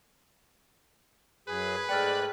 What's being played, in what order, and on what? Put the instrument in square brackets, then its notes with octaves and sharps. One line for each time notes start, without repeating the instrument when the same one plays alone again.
[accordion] F#2 G#4 [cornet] B4
[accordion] G#2 A3 F#6 [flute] D5 [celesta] G5 F6